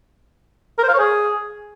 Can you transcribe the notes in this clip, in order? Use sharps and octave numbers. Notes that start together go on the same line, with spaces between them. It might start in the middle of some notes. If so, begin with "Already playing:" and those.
A#4
C5
F5
C#5
G#4